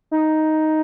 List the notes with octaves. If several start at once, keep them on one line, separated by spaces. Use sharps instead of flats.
D#4